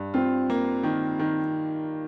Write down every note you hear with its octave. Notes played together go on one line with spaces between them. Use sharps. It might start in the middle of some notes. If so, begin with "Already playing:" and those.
Already playing: G2
C4 F4
A#3
D#3
D#3